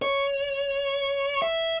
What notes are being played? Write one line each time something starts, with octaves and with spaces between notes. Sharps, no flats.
C#5
E5